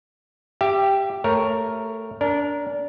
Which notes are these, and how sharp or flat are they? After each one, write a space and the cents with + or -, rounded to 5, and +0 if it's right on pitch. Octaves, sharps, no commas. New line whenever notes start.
G4 +0 E5 +35
A3 +15 A#4 +0 C#5 +0
D4 -25 A#4 +0